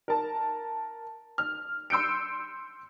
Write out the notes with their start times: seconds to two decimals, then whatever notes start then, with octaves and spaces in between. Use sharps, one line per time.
0.08 A#4 A5
1.38 F6
1.90 C6 E6 G6 C#7 D7